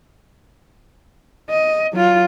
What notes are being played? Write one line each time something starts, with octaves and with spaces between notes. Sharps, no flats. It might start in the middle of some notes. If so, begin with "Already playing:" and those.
D#5
F#3 F4